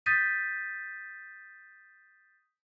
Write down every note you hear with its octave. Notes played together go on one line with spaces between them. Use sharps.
D#6 G6 A6 B6 D#7